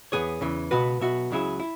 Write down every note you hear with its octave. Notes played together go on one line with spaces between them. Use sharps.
E2 B2 B3 G#4 C#5
E2 C#3 E3
C#2 B2 B3 F#4 B4
B1 B2 B3 F#4 E5
C#2 C#3 F#3 E4 G#4
E4